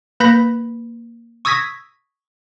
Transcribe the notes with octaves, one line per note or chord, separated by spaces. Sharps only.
A#3 B4 B5 G6 A#6 B6
C#6 D#6 E6 G#6 A#6 B6